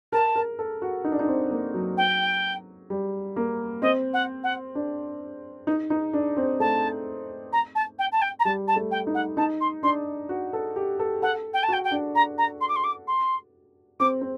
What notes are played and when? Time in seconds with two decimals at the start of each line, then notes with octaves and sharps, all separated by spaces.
0.12 A#4 A5
0.36 A#4
0.59 A4
0.82 F#4
1.05 D#4
1.12 D4
1.19 D#4
1.28 C4
1.51 A#3
1.74 F#3
1.97 G5
2.90 G3
3.36 A#3
3.82 C4 D#5
4.13 F#5
4.44 F#5
4.75 D4
5.67 D#4
5.90 D#4
6.13 D4
6.37 C4
6.60 A3 A5
7.53 A#5
7.75 A5
7.99 G5
8.12 A5
8.22 G5
8.40 A#5
8.45 G3 A5
8.68 A5
8.76 A3
8.91 G5
9.07 D#4
9.14 F#5
9.37 D#4 A5
9.61 C6
9.83 D4 C6
10.29 F#4
10.53 A4
10.76 G4
10.99 A4
11.22 A4 F#5
11.53 G5
11.63 A5
11.68 F#4
11.73 G5
11.84 G5
11.91 D4
12.15 A#5
12.38 A#5
12.61 C6
12.69 D6
12.76 C6
12.84 D6
13.07 C6
14.00 C4 D6
14.21 C4